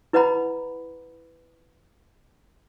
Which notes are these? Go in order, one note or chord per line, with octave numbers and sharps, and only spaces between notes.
E4 B4 D#5 F#5 A#5 B5